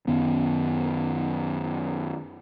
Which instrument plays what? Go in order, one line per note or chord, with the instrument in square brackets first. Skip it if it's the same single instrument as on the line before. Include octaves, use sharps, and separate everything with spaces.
[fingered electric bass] F#2 D#3 B3 C#4